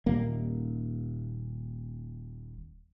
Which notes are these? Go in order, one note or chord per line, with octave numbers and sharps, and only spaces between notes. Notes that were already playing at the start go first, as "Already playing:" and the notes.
D#1 A#3